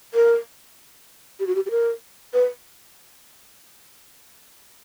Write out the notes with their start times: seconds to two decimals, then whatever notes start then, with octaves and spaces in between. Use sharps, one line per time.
0.14 A#4
1.40 G4
1.47 F#4
1.55 G4
1.66 G4
1.71 A#4
2.34 B4